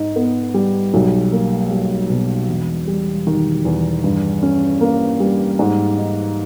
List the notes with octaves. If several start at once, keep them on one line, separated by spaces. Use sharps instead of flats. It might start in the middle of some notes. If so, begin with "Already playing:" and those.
Already playing: G#2 D#4
B3
G3
B1
A#3
G3
B2
E1
G3
D#3
E2
G2
C#4
A#3
G3
G#2
D#4